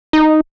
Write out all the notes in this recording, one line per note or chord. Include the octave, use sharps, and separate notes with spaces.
D#4